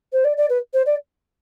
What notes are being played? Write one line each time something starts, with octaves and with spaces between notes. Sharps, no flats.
C5
D5
D5
B4
C5
D5